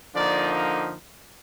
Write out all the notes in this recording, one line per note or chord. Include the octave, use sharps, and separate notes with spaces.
D3 F3 A#3 D#4 D5